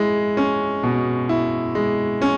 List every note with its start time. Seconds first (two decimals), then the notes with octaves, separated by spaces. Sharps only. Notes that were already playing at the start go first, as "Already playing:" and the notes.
Already playing: G#3 E4
0.37 C#4
0.83 B2
1.29 E4
1.75 G#3
2.22 C#4